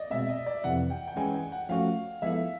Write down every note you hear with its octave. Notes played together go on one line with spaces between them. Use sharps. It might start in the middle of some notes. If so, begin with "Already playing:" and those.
Already playing: D5 D#5
B2 G#3 C4 E5
D#5
D5
F2 C3 E3 F#5
G5
G5
E3 G#3 C#4 E4 G#5
G#5
F#5
F3 A3 C#4 F#4 F5
F3 G#3 B3 E4 A4 E5